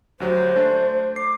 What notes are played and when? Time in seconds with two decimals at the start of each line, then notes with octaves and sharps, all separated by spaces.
0.20 D2 F#3 G4 C5
0.56 A3 D4
1.16 D6 C7